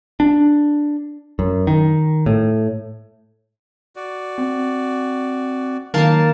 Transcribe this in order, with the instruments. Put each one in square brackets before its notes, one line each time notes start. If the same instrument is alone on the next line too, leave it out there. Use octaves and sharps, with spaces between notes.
[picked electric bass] D4
F#2
D#3
A2
[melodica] F#4 D5
[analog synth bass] C4
[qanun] D#3 A#3 [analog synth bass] F#3 [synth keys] A#4 F5 A5